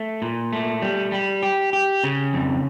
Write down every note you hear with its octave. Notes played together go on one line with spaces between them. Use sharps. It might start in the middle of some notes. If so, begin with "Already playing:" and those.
Already playing: A3
A#2
A3
G3
G3
G4
G4
C#3
F2